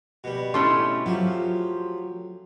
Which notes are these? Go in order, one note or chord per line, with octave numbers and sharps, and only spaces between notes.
B2 G3
A3 C#4 E4 C6
F3 F#3 G4